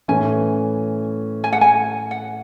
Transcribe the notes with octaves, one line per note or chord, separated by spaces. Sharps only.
A2 E3 A3 C#4 G#5
G#5
F#5
G#5
F#5